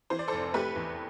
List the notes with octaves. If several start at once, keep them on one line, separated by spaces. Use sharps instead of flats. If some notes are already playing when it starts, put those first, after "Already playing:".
E3 C5
D5
F1 A4 C5
A3 G4 B4
E2